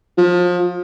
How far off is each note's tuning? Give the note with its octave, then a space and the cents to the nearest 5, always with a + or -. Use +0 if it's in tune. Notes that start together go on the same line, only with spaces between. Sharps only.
F3 +30